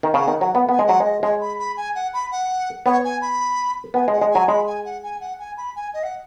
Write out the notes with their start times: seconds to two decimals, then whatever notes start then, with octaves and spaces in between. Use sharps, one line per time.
0.03 D#3
0.14 C#3 F#5
0.28 D#3
0.41 F#3 F#5
0.55 B3
0.69 B3 G#5
0.79 G#3
0.87 F#3 F#5
1.00 G#3 D#5
1.22 G#3 C#5
1.41 B5
1.59 B5
1.77 G#5
1.95 F#5
2.13 B5
2.31 F#5
2.86 B3 C#5
3.04 G#5
3.21 B5
3.94 B3 G#5
4.08 G#3 F#5
4.21 G#3
4.31 F#3 G#5
4.48 G#3 B5
4.66 G#5
4.85 F#5
5.03 G#5
5.21 F#5
5.39 G#5
5.57 B5
5.76 G#5
5.94 D#5
6.03 F#5